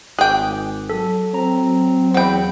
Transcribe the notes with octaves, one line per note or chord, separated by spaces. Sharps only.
G#1 G#4 G5 D6 F#6
F#3 A4
C4 A#5
E2 C4 F#5 G5 B5